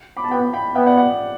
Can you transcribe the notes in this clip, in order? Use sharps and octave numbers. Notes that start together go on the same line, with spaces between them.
B5 D6
A5
B3 G5 B5
G5 B5
B3 E5 G5
D5 F#5
D5 F#5